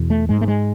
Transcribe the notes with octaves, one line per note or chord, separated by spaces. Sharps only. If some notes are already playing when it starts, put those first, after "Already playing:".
Already playing: E2 B2
A3
G#2 G#3
A3
G#3